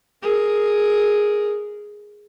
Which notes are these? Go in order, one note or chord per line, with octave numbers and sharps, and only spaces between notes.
G#4 A#4